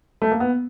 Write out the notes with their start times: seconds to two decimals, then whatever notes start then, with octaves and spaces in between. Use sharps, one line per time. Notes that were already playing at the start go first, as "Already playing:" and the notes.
0.22 A3
0.32 A#3
0.40 B3